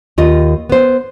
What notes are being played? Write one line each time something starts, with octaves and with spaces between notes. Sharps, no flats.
D#2 F4 D#5
B3 C5